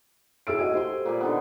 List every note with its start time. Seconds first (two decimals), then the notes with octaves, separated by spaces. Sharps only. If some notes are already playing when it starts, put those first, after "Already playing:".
0.47 A2 G#4 E6 D7
0.58 F#4 D#5 F5 G#5
0.74 G4 C5 C6
1.05 A#2 B4 D5
1.21 D3 D#3 B3